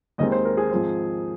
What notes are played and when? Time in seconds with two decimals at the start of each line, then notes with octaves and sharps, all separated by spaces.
0.18 D#2 D#3 G#3 C4 D#5
0.32 C5
0.45 A#4
0.57 G#4
0.71 G#2 F3 C4